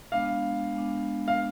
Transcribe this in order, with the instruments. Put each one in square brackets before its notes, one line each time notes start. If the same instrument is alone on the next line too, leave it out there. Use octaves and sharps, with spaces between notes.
[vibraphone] G#3 B3 D4 [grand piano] F5
[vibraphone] G#3 B3 D4
[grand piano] F5